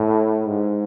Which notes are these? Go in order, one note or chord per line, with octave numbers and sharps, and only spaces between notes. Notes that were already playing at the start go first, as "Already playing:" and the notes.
Already playing: A2
G#2